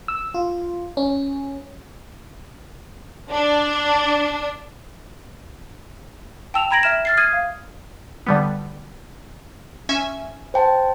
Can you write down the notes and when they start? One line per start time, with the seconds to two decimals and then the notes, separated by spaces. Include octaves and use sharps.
0.08 E6
0.34 F4
0.97 C#4
3.30 D4
6.54 G5 A5 E6 E7 F7
6.71 A#5 B5 G#6 A#6 D7 F#7
6.83 E5 F6 E7
7.05 F6 A6 C7
7.17 D#6 F6 G#6 C7 D#7
7.33 F5
8.26 D3 G3 B3
9.89 C#4 E5 G#5
10.54 C5 G5 A5